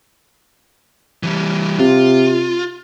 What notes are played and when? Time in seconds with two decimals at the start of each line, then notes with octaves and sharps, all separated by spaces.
1.23 E3 G3
1.79 C3 F4